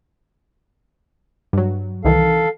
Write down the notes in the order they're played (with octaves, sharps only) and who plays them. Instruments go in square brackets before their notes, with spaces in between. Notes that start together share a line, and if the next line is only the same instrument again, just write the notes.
[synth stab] G2 F#3
[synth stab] C2 D#3 E3 [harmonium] A4 F5